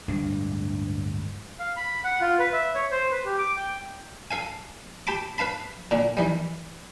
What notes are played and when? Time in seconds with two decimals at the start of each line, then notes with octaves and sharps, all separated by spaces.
0.08 D1 G2 G#3 D4
1.59 F5
1.76 B5
2.04 F#5
2.21 F4
2.39 B4
2.53 E5
2.75 C#5
2.91 C5
3.11 B4
3.25 G4
3.38 D6
3.56 G5
4.31 A4 F5 G#5
5.07 G4 A5 B5 D6
5.38 B4 F5 A5 B5
5.91 A#2 D3 D4
6.17 D#3 E3 G3